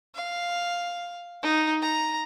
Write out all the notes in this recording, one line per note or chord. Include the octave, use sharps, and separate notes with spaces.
F5
D#4
A#5